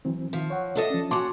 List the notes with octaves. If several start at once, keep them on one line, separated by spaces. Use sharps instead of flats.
E3 F#3 C4
D#3 F3
C#5 F#5
D4 A4 D#5
F3 C#4
C#4 F#4 A5 C6 D6